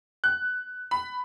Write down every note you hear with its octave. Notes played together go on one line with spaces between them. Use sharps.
F#6
B5